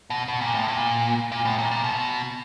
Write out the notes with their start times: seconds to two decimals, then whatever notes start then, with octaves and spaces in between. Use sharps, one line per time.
0.10 B2
0.28 B2
0.41 A#2
0.54 A2
0.68 A#2
1.32 A#2
1.45 A2
1.58 A#2
1.71 A#2
1.84 B2